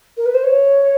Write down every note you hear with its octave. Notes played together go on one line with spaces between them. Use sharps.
A#4
B4
C5
C#5